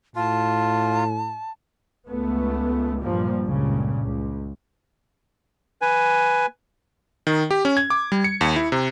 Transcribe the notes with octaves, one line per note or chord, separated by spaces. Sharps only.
A2 F4 A5
C#2 A3 B3
G2 A#2 F3 G3 A#3
C#2 G2 A#2 C#3
C#2
B4 G#5
D#3
G4
C#4
G#6
D6
G3
C#7
D#2
E4
C3